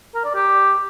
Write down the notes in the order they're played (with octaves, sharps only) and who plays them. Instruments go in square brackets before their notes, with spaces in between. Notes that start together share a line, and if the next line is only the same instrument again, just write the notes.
[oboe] A#4
D5
G4